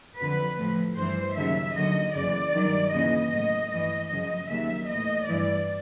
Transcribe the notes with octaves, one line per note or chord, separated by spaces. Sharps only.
F2 D3 F#3 B4
A2 F3
G2 E3 C5
D#2 C#3 F#3 E5
D#2 D3 F#3 D#5
F#2 C#3 E3 D5
G2 D#3 F#3
D#2 C#3 E3 D#5
A2 F#3 D#5
G2 E3 D#5
F#2 C#3 F3 D#5
D#2 C#3 F#3 E5
A2 E3 D#5
G2 E3 D5